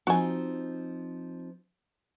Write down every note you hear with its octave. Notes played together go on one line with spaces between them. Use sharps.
F3 C4 D#4 F#4 G#5